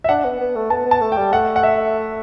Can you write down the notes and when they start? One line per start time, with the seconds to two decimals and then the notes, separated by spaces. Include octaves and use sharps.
0.04 E5
0.09 D4 F#5
0.24 B3
0.40 B3
0.56 A3
0.70 B3 A5
0.85 B3
0.91 A5
1.01 A3
1.12 G5
1.17 G3
1.32 A3 F#5
1.56 F#5
1.63 E5